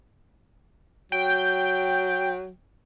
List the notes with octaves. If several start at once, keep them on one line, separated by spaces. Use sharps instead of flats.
F#3 G5